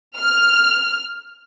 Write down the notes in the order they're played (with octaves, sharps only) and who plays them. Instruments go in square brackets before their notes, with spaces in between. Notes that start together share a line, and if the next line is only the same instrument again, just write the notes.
[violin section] F6